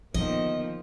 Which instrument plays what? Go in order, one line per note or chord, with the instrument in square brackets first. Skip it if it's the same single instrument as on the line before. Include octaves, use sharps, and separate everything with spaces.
[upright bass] D3 B3 [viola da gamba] D#3 F3 A#3 [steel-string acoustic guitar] D#5